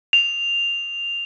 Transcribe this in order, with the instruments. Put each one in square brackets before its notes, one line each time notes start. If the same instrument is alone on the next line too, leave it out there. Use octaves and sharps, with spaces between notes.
[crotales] F7